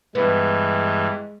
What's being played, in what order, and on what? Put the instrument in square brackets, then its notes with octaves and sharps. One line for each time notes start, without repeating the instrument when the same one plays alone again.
[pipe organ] G2 E3 [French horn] G#3 [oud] B3